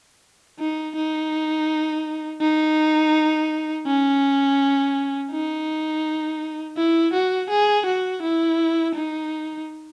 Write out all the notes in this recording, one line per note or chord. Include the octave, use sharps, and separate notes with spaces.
D#4
D#4
D#4
C#4
D#4
E4
F#4
G#4
F#4
E4
D#4